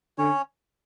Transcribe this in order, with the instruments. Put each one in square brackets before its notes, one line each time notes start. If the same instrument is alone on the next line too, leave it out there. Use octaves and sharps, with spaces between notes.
[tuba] D3 [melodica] C#4 C#5